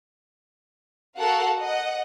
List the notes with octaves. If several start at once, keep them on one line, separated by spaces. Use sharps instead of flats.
F#4 A4 A#4 F5 F#5
D#5 F#5